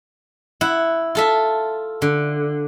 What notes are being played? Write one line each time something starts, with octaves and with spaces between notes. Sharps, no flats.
E4 F#5
F4 A4 E5
D3